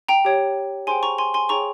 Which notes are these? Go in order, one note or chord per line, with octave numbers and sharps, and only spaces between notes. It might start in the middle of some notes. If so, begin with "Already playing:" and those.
G5 A#5
G4 C#5 G5
G#4 C5 G5 G#5 C6
A#5 C#6
G#5 C6
G#5 C6
G#4 C#5 G5 A#5 C#6